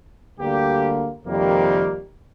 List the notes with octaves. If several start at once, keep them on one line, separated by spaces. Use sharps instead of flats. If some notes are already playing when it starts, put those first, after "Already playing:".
D2 D3 G3 A#3 G4
F2 C3 D#3 G3 A#3